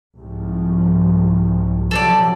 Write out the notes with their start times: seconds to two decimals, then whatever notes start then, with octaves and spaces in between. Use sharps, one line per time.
0.16 C2 G#2 F3
1.91 C3 F3 F#3 A4 C#5 D5